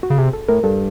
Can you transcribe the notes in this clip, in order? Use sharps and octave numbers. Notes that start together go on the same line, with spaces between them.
F#4
C#3
C3 G#4
A4
A2 A#4
G2 A4